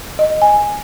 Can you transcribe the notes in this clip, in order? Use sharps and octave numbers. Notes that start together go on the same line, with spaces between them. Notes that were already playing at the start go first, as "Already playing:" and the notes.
D#5
G#5